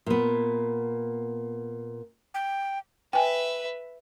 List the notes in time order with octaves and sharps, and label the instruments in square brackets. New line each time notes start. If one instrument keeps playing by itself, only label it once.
[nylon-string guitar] A#2 B3
[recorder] G5
[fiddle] B4 E5 [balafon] G5 G#5